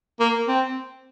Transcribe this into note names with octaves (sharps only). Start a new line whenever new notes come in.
A#3
C4